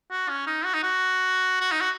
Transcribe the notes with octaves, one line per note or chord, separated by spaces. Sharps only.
F#4
C#4
D#4
F#4
D#4
F#4
F#4
D#4
F#4